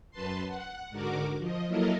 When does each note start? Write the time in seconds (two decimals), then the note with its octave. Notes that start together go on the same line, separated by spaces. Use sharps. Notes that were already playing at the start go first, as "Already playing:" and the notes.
0.11 F#2 B4 A5 C6
0.47 F#5
0.90 G#2 D3 F#4 A#4 D6
1.38 F3 D#5
1.67 F#3 A#3 E4 A4 A#4 D#5